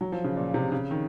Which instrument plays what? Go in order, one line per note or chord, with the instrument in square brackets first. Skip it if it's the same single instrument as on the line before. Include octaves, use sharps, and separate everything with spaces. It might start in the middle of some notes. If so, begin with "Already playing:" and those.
[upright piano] F#3
F3
C#3
A#2
C3
C#3
D#3